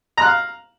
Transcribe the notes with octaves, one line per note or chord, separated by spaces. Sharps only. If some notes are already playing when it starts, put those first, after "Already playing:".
F5 A#5 F#6